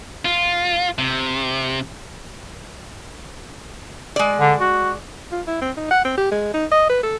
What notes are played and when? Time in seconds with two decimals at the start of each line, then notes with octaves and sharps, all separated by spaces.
0.25 F4
0.99 C3
4.16 G#3 D5
4.40 D3
4.60 F#4
5.32 F4
5.47 E4
5.61 C4
5.77 D#4
5.91 F#5
6.05 C4
6.17 G4
6.32 G#3
6.54 D#4
6.71 D#5
6.89 B4
7.03 A4